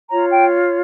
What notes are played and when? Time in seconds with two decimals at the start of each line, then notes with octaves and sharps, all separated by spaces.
0.11 F4 C#5 A#5
0.31 G5